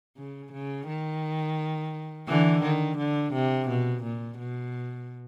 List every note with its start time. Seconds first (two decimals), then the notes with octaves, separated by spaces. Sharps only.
0.17 C#3
0.53 C#3
0.87 D#3
2.28 D3 E3
2.63 D#3
2.98 D3
3.33 C3
3.69 B2
4.03 A#2
4.38 B2